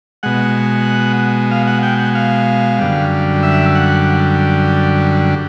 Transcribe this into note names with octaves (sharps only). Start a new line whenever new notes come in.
B2 G#3 F#5
F5
F#5
G5
F#5
F5
F#2 D3 G3
E5
F#5